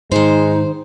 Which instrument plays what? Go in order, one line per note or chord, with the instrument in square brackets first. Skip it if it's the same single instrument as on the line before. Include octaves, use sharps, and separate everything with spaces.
[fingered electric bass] G#2 [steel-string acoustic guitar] D#3 C5 [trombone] G#3 [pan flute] D#4